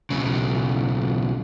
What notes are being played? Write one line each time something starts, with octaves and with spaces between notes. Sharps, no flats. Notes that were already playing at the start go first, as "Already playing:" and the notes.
B1 C#3